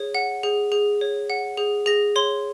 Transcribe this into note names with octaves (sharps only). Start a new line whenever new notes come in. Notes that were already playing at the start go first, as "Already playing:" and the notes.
Already playing: G#4 C#5
F#5
G#4
G#4
C#5
F#5
G#4
G#4 A#6
C#5 C6